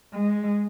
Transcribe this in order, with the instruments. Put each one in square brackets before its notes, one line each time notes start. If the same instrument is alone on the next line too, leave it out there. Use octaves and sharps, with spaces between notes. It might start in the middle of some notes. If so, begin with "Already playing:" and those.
[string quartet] G#3